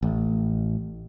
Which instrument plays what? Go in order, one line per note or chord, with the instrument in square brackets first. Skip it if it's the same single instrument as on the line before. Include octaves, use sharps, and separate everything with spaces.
[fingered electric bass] A1